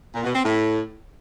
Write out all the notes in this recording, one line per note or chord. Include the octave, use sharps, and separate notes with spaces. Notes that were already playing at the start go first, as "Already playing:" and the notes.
A#2
B2
C4
A2